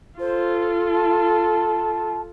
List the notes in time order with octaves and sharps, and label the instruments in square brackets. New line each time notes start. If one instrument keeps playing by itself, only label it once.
[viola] F4 A4 [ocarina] C5
[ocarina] A5